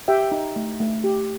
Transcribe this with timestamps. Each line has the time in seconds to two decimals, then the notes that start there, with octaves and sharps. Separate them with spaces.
0.08 G4 E5 G5
0.32 D#4
0.56 A3
0.80 A3
1.04 G4